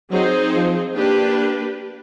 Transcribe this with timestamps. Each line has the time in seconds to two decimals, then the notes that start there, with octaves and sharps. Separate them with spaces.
0.11 F#3 C4 D#4 G#4 C5
0.54 F3
0.96 A#3 D4 G4 B4